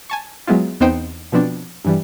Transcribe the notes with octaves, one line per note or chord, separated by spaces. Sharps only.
G#5 A5 C#6
F#3 G#3 B3 E4 F4
E2 B3 C4 D#4 C5 G5
B2 F3 B3 C4 D4
G2 E3 G3